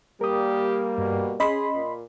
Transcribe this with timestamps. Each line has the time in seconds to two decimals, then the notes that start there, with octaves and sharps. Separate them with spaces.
0.21 G3 A#3 G4 A#4 D#6
0.98 G2 B2
1.40 C#4 G#4 D#5 B5 C6
1.74 A#2